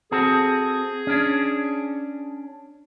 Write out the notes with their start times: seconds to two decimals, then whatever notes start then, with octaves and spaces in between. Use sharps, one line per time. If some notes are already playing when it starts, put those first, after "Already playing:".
0.12 C4 F#4 G#4 A4
1.07 C#4 D4